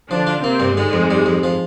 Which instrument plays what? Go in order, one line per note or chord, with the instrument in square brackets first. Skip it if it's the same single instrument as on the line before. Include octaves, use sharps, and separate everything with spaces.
[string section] D3 D4 [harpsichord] F3
[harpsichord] F4
[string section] C3 C4 [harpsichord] A#3
[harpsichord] G2
[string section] G#2 G#3 [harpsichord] D3
[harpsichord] F2
G3
F2
F3